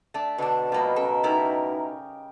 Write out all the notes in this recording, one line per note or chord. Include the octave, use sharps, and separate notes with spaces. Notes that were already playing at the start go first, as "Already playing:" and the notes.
A3 D4
B2 D3 D4 A5
F3 G3 A#3 B4 D#5
C#3 A4 A#4
A3 D#4 E4 G4 A#4